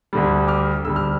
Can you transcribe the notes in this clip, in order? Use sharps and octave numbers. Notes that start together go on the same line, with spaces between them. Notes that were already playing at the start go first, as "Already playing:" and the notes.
D2 D3 G3
D6 F6
D2 D3 G3 E6
F6